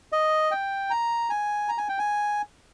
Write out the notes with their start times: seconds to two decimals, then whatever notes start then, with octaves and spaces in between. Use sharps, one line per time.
0.12 D#5
0.51 G5
0.90 A#5
1.30 G#5
1.69 A#5
1.78 G#5
1.89 G5
1.99 G#5